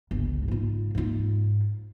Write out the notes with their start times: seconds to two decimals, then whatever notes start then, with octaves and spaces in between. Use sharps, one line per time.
0.11 G1 C#2
0.48 G#2 F4
0.95 G#2 F4